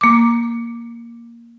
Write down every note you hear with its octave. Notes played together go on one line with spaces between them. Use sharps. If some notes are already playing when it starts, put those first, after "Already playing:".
A#3 D6